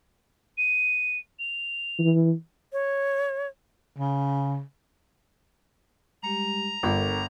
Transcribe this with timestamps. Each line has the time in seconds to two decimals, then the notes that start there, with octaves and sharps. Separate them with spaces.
0.58 D#7
1.39 F7
1.99 E3
2.73 C#5
3.97 C#3
6.23 G3 G#3 G4 A#5
6.83 G1 D4 A4 A#4